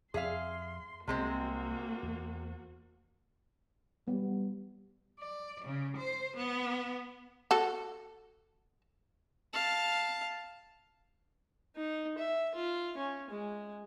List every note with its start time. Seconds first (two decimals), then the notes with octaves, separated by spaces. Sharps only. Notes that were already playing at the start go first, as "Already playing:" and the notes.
0.14 F2 C4 G#4 E5 F5 C6
1.08 C2 C3 G#3 A#3 C4 F#4
2.03 E2
4.08 G3 B3
5.20 D5
5.65 C#3
5.97 C5
6.36 B3
7.51 F#4 A4
9.54 F5 A5
11.76 D#4
12.18 E5
12.55 F4
12.97 C#4
13.30 G#3